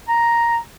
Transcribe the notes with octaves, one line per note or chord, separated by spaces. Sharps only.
A#5